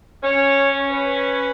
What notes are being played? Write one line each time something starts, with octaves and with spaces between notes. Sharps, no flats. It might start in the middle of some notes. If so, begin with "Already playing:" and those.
C#4 C#5
B4